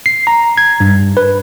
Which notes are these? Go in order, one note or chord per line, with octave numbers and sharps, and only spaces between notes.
C7
A#5
G#6
G2
B4